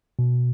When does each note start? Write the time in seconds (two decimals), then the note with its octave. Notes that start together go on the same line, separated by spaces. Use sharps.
0.19 B2